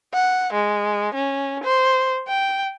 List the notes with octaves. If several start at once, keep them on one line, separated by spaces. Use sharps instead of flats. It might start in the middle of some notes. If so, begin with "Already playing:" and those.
F#5
G#3
C#4
C5
G5